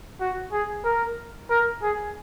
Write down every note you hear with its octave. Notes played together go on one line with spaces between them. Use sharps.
F#4
G#4
A#4
A#4
G#4